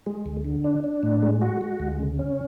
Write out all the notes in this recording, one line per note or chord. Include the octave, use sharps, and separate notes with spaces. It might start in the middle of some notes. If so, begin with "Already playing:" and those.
G#3
D2
D3
D4
D4
A2
G#3
F#4
G#3
D2
C#3
C#4